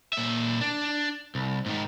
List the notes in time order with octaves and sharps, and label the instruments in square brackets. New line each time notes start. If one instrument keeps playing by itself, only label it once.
[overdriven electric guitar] A#2 E5
D4
C2
G#2 D#3